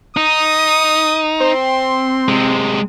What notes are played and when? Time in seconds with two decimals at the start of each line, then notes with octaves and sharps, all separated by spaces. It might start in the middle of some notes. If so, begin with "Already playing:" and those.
0.17 D#4 D#6
1.40 C4 C6
2.29 C3 G#3